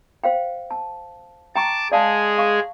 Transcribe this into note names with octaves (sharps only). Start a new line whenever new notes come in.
C5 F5 G5
A5
G5 A5 A#5 C#6 D6
G#3 G#4 D5 F5 A5
F5 C#6